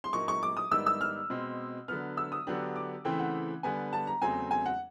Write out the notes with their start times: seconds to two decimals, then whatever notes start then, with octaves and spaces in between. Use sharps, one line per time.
0.04 C6
0.13 A#2 F#3 A#3 D#4 C#6
0.28 C#6
0.43 D6
0.57 D#6
0.71 G#2 D#3 G3 B3 D#4 E6
0.86 E6
1.01 F6
1.30 B2 G#3 C4
1.88 D3 F#3 B3 F6
2.17 E6
2.32 D#6
2.47 D3 F#3 B3 D4 G4
2.76 D6
3.05 C#3 E3 A3 C4 E4 G5
3.19 F#5
3.63 D3 G3 B3 G#5
3.93 A5
4.07 A#5
4.22 E2 C#3 F#3 A3 C4 G#5
4.51 G#5
4.66 F#5